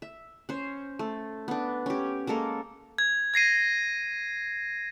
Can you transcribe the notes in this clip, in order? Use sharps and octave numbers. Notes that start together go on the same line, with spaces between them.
E5
C#4 C5
A3
B3 D4
C#4 G4
G#3 A#3 A4 A#4
G#6
G#6 A#6 C7 D#7